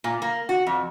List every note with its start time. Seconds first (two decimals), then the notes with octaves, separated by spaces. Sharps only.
0.04 A#2
0.22 A#3
0.49 F#4
0.67 F2